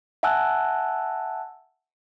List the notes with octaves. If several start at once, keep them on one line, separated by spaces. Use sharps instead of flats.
E5 F#5 G#5 A5 E6 F#6